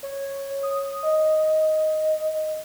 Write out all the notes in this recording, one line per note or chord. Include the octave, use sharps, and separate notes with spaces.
C#5
D#6
D#5